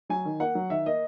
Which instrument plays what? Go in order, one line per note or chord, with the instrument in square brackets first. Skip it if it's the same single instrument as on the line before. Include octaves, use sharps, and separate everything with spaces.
[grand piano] F#3 G#5
D#3
A#3 F#5
F#3
D#3 E5
A#3 D#5